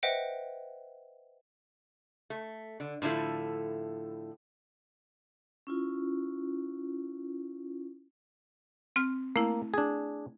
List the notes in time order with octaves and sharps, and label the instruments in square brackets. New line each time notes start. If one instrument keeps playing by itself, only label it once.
[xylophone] B4 C5 D#5 E5 F#5 G5
[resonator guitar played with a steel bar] A3
D3
A2 D3 F3 E4 A4
[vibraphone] C#4 E4 F4
[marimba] C4 F6
[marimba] A3 E4 [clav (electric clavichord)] A#3
[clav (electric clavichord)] D4 G#4